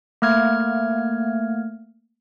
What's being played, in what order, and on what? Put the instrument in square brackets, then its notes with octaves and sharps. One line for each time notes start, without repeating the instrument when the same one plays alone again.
[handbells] A3 A#3 F6 G#6